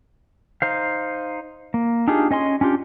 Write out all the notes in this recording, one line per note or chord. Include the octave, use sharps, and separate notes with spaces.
D#4 C5 F5
A#3
D4 D#4 F4 G4 G#4
C#4 D#5 G#5 C6
C#4 D4 F4 G4